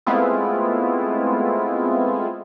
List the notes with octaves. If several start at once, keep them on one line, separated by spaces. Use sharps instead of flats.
G#3 A3 B3 C4 E4 F4